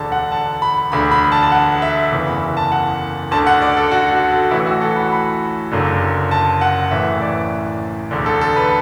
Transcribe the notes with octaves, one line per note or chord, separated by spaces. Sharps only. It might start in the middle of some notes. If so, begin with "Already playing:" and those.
Already playing: E1 D2 D3 A5
F#5
A5
B5
E1 D2 D3 B5
B5
A5
A5
F#5
E5
F#1 E2 E3
B5
A5
F#5
D2 D3 A5
F#5
D5
A4
F#4
F#4
A4
A1 A2 E3 E4
F#4
A4
B5
B5
F#1 F#2 D3
A5
F#5
A1 A2 E3 E5
D5
E1 D2 D3
A4
A4
B4